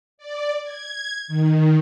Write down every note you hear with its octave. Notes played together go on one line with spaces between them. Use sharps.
D5
G#6
D#3